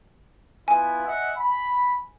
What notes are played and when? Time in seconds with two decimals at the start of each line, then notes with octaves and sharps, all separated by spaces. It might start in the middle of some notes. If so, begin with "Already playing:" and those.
0.68 B3 E4 F4 G#5
1.06 D#5 E5 F#5
1.37 B5